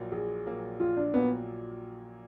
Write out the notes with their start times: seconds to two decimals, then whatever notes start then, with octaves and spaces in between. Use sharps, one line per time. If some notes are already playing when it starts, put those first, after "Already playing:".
Already playing: A#1 A#2 F#3 A#3
0.12 A#1 G#4
0.46 A#2 F#3 A#3
0.80 A#1 F4
0.97 D4
1.14 A#2 F#3 A#3 B3